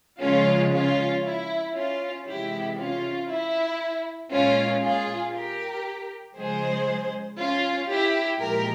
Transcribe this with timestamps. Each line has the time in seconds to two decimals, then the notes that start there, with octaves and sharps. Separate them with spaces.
0.21 C#3 F3 G#3 C#4 F4
0.73 C#4 F4
1.24 E4
1.75 C#4 F4
2.26 C3 E3 G#3 E4 G4
2.77 C#4 F4
3.28 E4
4.31 A#2 G#3 C#4 F4
4.82 F4 G#4
5.33 G4 A#4
6.36 C#3 F3 G#3 G#4 C5
7.38 C#4 F4
7.90 E4 G4
8.41 A#2 F3 G#3 G4 A#4